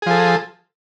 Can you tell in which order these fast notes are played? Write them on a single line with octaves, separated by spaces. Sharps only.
G#4 F3 A4